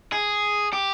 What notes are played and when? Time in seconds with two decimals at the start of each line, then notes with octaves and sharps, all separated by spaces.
0.12 G#4
0.73 G4